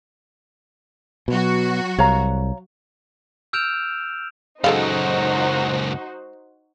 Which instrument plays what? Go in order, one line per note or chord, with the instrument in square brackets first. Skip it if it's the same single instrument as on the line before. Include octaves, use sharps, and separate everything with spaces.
[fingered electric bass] B2 [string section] F#3 F#4
[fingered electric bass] C2 [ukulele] C#5 F5 A#5
[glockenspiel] E6 F6 G6 D7 E7 F7
[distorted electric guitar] C#2 F#2 [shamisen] G#3 A4 F5 [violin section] D#4 F#4 C5